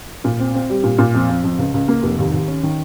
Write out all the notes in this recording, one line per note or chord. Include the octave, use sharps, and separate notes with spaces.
A#2
C4
C4
G3
A#2
A#2
F2
F2
F2
C#2
C#2
A#3
F1
D#2
D#2
C#4
D#3